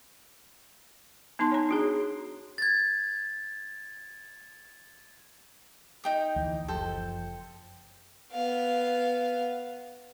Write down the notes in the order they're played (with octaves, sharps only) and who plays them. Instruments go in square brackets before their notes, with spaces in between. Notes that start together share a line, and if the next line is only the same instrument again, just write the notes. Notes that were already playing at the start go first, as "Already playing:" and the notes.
[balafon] B3 D#4 A5 C6
C#5 A#5
D4 F#4 G#4
[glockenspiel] G#6 A6
[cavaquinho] D#4 G5 D#6
[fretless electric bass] D2 E3 A#3
[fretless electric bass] F#1 F3 [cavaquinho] A4 C5 G5
[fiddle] B3 F5